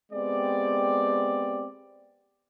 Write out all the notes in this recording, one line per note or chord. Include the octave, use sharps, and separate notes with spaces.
G#3 B3 C4 G4 D5